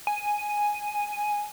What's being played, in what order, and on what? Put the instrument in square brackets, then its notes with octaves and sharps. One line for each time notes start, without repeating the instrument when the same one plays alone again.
[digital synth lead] G#5